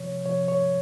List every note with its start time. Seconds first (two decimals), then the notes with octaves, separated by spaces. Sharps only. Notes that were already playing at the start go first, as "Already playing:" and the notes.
Already playing: C3 F3 C#5
0.26 C3 F3 C#5
0.48 C#5